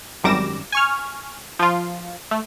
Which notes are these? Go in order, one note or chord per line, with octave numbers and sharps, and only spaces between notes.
G#1 F#2 G3 D6 A#6 E7
G#5 C#6 F6
F3 F4
A3